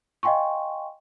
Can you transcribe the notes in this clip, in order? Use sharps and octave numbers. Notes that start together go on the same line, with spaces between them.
D#5 F5 G5 G#5 C6 C#6